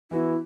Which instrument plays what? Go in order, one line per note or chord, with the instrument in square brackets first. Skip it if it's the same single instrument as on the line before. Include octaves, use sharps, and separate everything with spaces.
[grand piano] E3 B3 F#4 [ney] E4